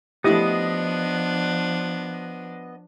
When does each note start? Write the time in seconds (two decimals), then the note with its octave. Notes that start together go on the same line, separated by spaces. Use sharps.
0.24 F3 A3 B3 D4 E4 G4 D#5